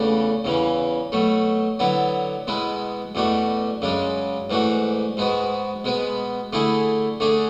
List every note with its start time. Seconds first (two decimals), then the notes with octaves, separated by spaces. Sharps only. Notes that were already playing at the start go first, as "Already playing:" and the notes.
Already playing: E2 C#3 E3 A3 D4
0.45 E2 C#3 E3
1.12 B2 F#3 A3
1.79 D3 F#3 B3 E4
2.47 B2 G#3 B3 E4
3.15 E2 B2 A3 D4 F#4
3.82 F#2 C#3 G#3 D4
4.50 G#2 E3 A3 D4 F#4
5.17 G#2 G#3 B3 F#4
5.84 B2 G#3 B3
6.53 D3 A3 E4 G#4
7.20 D3 A3 D4 G#4